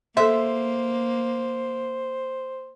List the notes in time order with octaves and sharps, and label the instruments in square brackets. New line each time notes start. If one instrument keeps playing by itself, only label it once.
[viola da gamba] A#3 [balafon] A4 C6 [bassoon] C5 [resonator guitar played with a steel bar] E5